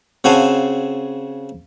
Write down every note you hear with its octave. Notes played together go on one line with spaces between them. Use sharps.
C#3 C4 F#4 F5 G#5 A5